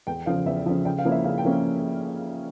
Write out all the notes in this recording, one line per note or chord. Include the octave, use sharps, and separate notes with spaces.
E2 G5
C#3 F3 F5
E2 E5
C#3 F3
C#3 G5
F5
F3 A#3 C#4 E4
E5
C#3 F5
G5
F3 A#3 C#4